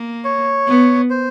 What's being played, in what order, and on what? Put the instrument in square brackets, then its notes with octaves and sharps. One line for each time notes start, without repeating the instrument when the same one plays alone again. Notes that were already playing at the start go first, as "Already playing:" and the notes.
Already playing: [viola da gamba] A#3
[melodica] C#5
[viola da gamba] B3
[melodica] C5